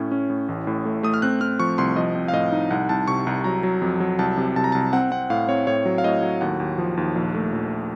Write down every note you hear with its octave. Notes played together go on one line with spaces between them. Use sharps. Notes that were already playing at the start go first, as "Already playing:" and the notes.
Already playing: A2 C#4
C#4
A2
A1
A2
A3
A3 D#6
F6
C4 F#6
C4 F6
F3 C#6
C2 C6
F3 D#5
C4
F5
A2 D#5
D#4
C2 F#5
C2 A5
C3 C#6
C2 A#5
F#3 A#5
F#3
F2
F#3
C2 A5
C3
C2 A5
A#5
C2 A5
C4 F#5
C4 F#5
A2 F5
C4 C#5
A2 C#5
F#3
F5
A2 D#5
F#3
D#2 F#5
D#2
F3
D#2
A#1
A3
A#1